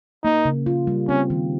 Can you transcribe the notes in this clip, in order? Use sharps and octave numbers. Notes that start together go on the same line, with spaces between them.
A#3 D#4
C#3
F4
G3
C4 C#4
D#3